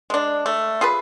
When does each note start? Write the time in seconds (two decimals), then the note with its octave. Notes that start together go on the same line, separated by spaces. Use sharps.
0.10 G#3 D4
0.46 A3
0.81 F4 G#4 B4